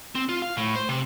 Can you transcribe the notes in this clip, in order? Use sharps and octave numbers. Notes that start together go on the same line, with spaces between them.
C4
F4
F5
A2
C5
C3